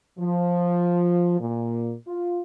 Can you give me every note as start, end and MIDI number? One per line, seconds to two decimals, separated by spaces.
0.19 1.39 53
1.41 1.94 46
2.08 2.42 65